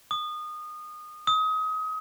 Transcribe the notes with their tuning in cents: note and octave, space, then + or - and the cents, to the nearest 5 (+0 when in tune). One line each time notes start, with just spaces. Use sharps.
D#6 -25
D#6 +30